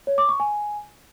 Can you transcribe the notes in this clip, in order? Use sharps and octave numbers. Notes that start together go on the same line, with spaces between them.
C#5
D6
C#6
G#5